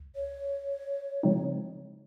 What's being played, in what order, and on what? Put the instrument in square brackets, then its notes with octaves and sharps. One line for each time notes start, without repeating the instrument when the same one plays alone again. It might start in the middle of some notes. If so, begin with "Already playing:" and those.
Already playing: [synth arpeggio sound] C#2
[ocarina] C#5
[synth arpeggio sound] C#3 F3 G#3 C4 D#4